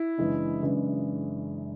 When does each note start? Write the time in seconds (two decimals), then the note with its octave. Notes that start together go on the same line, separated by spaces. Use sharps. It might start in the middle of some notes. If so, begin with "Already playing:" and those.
Already playing: E4
0.18 F#1 F#2 E3 G#3 D4
0.63 F#1 F#2 E3 G#3 D4